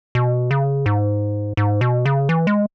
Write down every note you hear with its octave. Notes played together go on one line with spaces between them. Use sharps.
B2
C#3
G#2
G#2
B2
C#3
E3
G#3